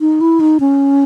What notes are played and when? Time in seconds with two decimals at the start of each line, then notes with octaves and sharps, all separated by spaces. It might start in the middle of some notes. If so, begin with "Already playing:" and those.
0.01 D#4
0.21 E4
0.40 D#4
0.60 C#4